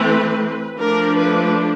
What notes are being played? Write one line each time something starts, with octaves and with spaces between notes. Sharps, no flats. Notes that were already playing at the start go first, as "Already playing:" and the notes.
Already playing: E3 A3 C4 B4
F3 A3 D4 A#4
B4